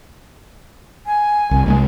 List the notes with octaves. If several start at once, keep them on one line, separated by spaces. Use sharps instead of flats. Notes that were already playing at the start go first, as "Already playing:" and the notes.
G#5
C2
C2 G3 G#3